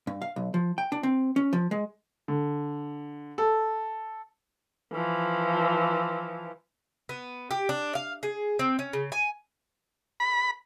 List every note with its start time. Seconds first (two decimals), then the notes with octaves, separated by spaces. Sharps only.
0.07 G2
0.22 F5
0.36 B1
0.54 F3
0.78 G5
0.92 D4
1.03 C4
1.36 C#4
1.53 F3
1.71 G#3
2.28 D3
3.38 A4
4.92 E3 F3
7.09 B3
7.51 G4
7.69 D4
7.95 F5
8.23 G#4
8.59 C4
8.79 C#4
8.93 C#3
9.12 G#5
10.20 B5